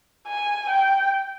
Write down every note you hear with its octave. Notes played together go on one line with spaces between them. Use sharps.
G#5
G5